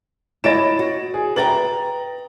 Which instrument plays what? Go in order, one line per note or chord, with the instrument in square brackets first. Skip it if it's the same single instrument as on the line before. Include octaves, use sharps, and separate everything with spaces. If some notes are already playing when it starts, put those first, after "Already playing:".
[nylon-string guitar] E4 [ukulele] C#5 D#5 B5 [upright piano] A6 D7 E7
[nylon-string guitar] F#4
[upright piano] G#4
[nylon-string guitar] B4 E5 G5 [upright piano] A#5 A6 F#7